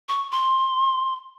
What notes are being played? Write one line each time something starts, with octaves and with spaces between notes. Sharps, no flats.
C#6
C6